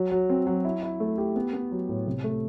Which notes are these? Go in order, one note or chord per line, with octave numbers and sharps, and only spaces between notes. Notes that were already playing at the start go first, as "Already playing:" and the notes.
Already playing: F#3
F#3
C4
F#3
E4
E4
A3
G4
B3
B3
F#3
A2
C3
A3